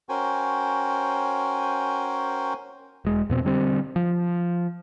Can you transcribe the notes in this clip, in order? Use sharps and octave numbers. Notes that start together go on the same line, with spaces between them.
C#4 F#4 A#4 C5 G5 G#5
E1 G#3
F2 B2 C4
D3 G3 C4
F3